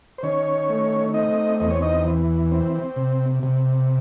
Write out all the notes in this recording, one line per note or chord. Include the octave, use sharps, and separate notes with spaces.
C5
D#3 C#4 C#5
A3
C4 D#4 D#5
E2 D#5
C#5
D#4 D#5
E3
C4
C3
C3